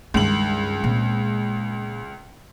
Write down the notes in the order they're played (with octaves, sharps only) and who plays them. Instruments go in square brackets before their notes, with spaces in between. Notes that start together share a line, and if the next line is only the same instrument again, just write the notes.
[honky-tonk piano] C#2 F#7 [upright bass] G2 D#3
[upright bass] A#2 C4